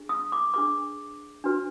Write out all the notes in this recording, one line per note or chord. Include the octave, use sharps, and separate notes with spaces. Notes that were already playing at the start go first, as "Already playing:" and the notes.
Already playing: D4 G#4
D#6
D6
D4 G#4 B4 D6
D4 F#4 B4